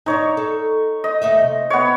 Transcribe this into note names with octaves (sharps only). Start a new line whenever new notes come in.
G#2 D4 D#4 C#5
A4
D#5
D#2 A3 E5
C3
B3 C#5